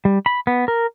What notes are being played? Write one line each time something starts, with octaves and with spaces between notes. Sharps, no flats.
G3
B5
B3
A#4